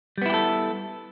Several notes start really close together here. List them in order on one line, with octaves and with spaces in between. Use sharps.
G3 B3 E4 G4 A4